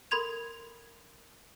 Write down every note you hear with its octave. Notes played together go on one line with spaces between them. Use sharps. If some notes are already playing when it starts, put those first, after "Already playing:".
A4 A#4 B5 C6 G#6 F7